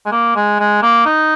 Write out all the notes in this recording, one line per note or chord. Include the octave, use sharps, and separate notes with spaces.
G#3
A#3
G#3
G#3
A#3
D#4